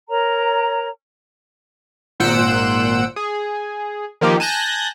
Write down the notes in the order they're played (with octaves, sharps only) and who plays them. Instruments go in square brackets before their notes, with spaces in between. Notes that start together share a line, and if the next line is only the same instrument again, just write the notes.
[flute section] A#4 C#5 A#5
[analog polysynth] G#1 A#2 C5 F#5 E6 D7
G#4
D#3 F3 A#3 D#4 G4
G#5 A5 F#6 G6 A#6